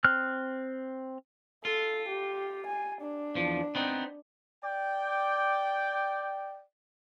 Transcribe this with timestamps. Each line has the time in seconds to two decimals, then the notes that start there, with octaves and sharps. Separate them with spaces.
0.04 C4 F6 F#6
1.65 F4 A4
2.08 G4
2.66 G#5
3.01 D4
3.35 E2 F3
3.75 B3 C4 D#4
4.64 D5 G5